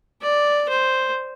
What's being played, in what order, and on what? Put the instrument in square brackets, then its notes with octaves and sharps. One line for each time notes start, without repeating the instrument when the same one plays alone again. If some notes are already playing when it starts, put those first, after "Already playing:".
[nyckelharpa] D5
C5